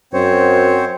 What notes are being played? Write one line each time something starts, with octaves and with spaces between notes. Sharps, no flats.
F#2 C4 C5 C#5